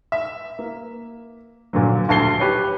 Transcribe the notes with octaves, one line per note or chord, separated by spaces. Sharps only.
E5
A#3
A#1 A#2 D3 F#3
D#1 D2 A5 C7 G7
G4 B4 C#5